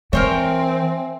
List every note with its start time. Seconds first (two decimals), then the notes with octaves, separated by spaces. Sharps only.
0.13 E3 C4 A#4 C5 C#5 E5 G#5 C6